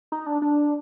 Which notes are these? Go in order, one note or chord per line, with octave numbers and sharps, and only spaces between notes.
D#4
D4
D4